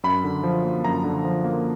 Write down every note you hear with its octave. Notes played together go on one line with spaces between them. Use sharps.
F#2 B5
D3
F3
A#3
F#2 A#5
D3
F3
A#3